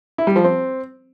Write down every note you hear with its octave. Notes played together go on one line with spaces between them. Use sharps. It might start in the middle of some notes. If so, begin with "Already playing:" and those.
E4
G3
F3
C4